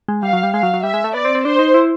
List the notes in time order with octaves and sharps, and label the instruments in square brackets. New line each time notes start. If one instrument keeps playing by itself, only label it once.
[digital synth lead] G#3
[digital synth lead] G3 [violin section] F5
[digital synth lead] F#3
G3
[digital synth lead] G#3 [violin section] F5
[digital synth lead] F#3
F#3
[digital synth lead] G3 [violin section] E5
[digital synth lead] G#3
A3
[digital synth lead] B3 [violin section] D5
[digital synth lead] C4
C4
[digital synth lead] D4 [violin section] C5
[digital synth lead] D#4
E4